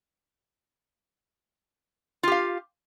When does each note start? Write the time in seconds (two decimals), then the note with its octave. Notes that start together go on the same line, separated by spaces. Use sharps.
2.23 F4
2.28 G4
2.32 F5